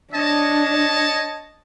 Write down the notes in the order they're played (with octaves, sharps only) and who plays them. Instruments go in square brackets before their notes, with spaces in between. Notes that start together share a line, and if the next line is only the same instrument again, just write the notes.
[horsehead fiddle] D4 [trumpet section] C#5 D#5 A5